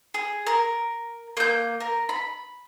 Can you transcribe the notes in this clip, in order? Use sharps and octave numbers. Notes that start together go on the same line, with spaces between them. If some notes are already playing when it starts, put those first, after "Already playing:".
G#4
A#4
A#3 G6
A#4
B5